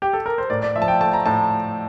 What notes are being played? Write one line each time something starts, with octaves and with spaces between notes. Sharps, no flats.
G4
A4
A#4
C5
A2 D5
D5
F3 E5
A5
G5
A3 A5
A#5
A2 A5